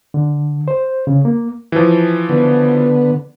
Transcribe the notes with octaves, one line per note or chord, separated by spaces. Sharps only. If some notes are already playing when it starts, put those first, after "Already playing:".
D3
C5
C#3
A#3
E3 F3
D3 B3